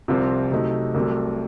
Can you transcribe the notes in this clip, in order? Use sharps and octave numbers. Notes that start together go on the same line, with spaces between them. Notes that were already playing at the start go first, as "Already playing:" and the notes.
C2 C3 F3 C4 F4
C3 F#3 A3 D#4
C2 C3 F#3 A3